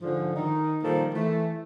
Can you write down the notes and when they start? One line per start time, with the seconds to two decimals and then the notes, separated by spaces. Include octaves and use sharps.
0.01 G#2 D3 F3
0.36 D#3 D#4
0.83 A#2 D#3 F3 G3 A#3 A4
1.14 E3 A3